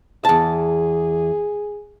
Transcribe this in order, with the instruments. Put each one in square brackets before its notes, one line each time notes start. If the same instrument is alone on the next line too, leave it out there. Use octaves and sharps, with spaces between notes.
[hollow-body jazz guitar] E2 A5 [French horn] G#4